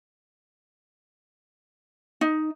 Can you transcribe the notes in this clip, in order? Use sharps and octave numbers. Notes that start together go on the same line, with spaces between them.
D#4